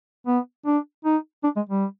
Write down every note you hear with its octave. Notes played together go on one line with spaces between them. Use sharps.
B3
D4
D#4
D4
G#3
G3